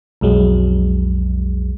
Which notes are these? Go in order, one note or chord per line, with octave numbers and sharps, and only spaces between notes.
B1 F2 F#3 G#3